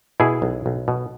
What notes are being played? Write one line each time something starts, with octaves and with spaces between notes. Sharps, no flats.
B2 E4 G#4
B1
B1
B2